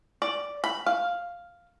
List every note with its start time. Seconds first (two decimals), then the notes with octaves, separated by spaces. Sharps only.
0.22 D5
0.64 B5
0.86 F5